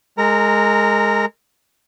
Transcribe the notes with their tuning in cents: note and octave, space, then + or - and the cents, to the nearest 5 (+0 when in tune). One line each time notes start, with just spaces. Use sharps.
G#3 +0 A#4 -25 A#5 +0